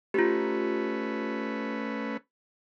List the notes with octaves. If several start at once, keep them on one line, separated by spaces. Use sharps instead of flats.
A3 C#4 F4 G4 B4